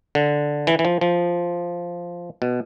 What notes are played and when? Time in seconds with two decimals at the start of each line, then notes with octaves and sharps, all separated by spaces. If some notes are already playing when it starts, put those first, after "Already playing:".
0.15 D3
0.67 E3
0.79 E3
0.85 F3
1.01 F3
2.42 B2